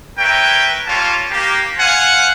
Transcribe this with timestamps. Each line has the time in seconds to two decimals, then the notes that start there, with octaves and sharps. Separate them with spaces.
0.18 A#4 B4 C#5 E5 G5
0.87 G3 A#3 F4 C#5 F5 A5
1.31 A#3 G4
1.77 C5 F5 F#5 G#5